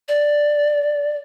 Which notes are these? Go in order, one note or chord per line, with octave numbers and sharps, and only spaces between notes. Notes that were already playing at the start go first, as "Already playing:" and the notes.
D5